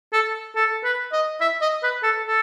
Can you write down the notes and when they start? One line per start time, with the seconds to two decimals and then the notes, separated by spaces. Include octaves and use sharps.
0.13 A4
0.55 A4
0.84 B4
1.12 D#5
1.41 E5
1.61 D#5
1.83 B4
2.03 A4
2.25 A4